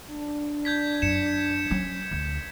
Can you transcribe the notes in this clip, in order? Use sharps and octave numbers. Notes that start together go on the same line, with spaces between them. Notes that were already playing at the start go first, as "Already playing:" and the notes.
D4
G6 G#6 B6
F#2 C#7 E7
F#3 C#4
D2